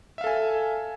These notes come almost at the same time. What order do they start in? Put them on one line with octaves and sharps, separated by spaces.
E5 F5 A4 G#5